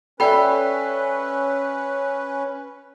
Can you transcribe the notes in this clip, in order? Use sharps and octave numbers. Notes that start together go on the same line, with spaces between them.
C#4 A4 B4 D5 E5 G5 B5